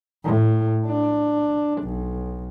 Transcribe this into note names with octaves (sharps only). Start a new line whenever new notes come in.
A2
D4
B1